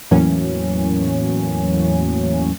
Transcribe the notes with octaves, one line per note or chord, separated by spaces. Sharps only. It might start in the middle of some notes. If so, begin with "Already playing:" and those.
E2 A2 E3 F#3 A#3 C#4